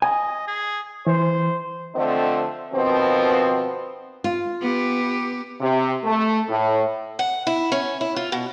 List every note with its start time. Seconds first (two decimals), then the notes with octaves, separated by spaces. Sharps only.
0.02 D#5 G#5
0.47 G#4
1.07 E3 C5
1.95 D3 F3 A3 C4 C5 D#5
2.73 B2 D#3 F3 B3 C4
4.24 F4
4.61 B3 G4
5.60 C3
6.04 A3
6.49 A2
7.19 F#5
7.47 E4
7.72 C#4
8.01 E4
8.16 F4
8.32 B2